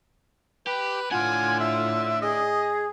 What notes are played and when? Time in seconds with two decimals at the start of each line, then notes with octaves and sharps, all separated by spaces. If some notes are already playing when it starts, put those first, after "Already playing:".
0.67 G4 B4
1.12 A2 D4 F4 F#5 G#5
1.60 E5
2.21 G#4 D#5